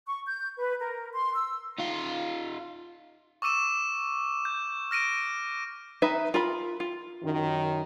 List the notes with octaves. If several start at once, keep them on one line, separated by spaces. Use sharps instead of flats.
C#6
G6
B4
A#4
C6
E6
D#4 F4
C#6 D6 E6 D#7 E7
G6
F6 A#6 D7 D#7
D#4 B4 E5
F4 A#4 B5
F4
F#2 D#3